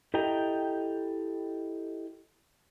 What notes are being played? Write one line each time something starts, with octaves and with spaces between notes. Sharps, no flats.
E4 G4 A4 D#5 G5 A#5